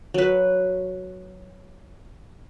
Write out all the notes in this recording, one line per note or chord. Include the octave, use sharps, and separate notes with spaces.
F#3 B4